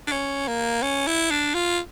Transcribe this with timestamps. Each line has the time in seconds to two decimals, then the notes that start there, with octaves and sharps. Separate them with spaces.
0.07 D4
0.12 C#4
0.48 A#3
0.82 C#4
1.07 E4
1.31 D4
1.54 F4